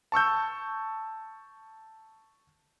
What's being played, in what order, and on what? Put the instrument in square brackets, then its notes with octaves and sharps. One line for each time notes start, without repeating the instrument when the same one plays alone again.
[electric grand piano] A5 C#6 E6 G6